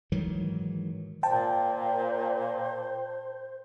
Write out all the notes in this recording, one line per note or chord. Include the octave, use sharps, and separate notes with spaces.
G#2 D#3 E3 F#3
A#2 C5 G5 A5